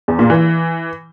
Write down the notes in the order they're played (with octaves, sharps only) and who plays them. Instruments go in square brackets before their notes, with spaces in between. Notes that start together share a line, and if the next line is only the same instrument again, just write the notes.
[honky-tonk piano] E2
A#2
E3